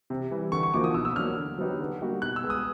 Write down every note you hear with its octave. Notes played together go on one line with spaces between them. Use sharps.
C3
E3 G3
D3 C#6
C#6
F3 A#3 D#4 F#4 D6
D#6
B2 E6
E6
F#3 A#3 D4 F6
D3
F#3 B3 D#4 G4
D3
G3 A#3 D#4 F#4
B2 F#6
E6
G#3 B3
D#6